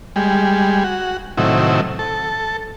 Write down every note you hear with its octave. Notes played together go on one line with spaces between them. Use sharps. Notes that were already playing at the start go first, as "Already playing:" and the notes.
G3 G#3
F#4
A2 C3 D#3 F#3 E4
A4